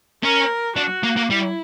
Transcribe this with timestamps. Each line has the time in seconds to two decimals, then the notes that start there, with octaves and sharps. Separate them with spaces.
0.23 C#4 A#4
0.77 D4 F#4
1.03 A#3
1.16 A#3
1.30 G3 E4